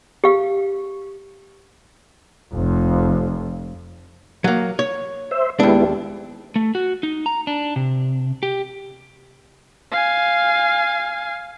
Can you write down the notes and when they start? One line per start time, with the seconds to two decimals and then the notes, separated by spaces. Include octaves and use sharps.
0.24 G4 F5
2.54 F1 F2
4.44 F#3 A#3
4.79 C#5
5.31 C5 E5
5.60 D#2 G#3 B3 D4 E4
6.56 A3
6.75 F#4
7.03 D#4
7.26 A#5
7.47 D4
7.76 C3
8.43 G4
9.92 F5 G#5